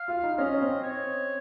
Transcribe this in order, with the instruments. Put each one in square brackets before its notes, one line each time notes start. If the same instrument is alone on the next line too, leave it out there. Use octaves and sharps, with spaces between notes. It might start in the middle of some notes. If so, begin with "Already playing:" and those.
Already playing: [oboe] F5
[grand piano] F4
D#4
[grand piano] C#4 [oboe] D#5
[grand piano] C4
[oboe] C#5